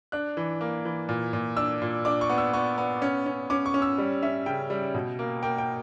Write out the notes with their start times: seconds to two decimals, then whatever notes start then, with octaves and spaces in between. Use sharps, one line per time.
0.12 D4 F#6
0.37 E3
0.61 A#3
0.85 E3
1.09 A#2
1.33 A#2
1.57 D4 E6
1.82 A#2
2.05 D4 D6
2.21 C#6
2.30 B3
2.38 E6
2.53 B3 C#6
2.78 B3
3.02 C#4
3.26 C#4
3.50 C#4 D6
3.66 C#6
3.74 C#4
3.82 E6
3.98 G3
4.23 C#4 E5
4.46 C#3 G5
4.70 G3
4.94 B2
5.19 A#3
5.43 A#3 G5
5.58 G5